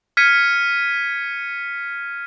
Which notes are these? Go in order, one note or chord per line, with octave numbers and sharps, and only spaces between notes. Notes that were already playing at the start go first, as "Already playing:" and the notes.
F6 G#6 B6 C#7 D#7